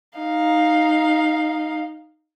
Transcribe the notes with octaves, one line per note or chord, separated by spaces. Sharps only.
D#4 F5